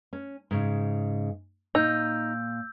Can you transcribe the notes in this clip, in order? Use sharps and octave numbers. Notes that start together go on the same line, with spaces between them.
C#4
G#2 C#3
A#2 D#4 E6 G6